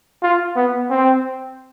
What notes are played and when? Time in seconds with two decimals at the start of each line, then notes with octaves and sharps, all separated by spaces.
0.22 F4
0.56 B3
0.90 C4